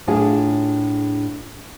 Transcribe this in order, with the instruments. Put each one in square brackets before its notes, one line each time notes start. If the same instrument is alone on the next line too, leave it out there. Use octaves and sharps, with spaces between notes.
[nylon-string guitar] A2 D4 F4 G#4 C#5 A5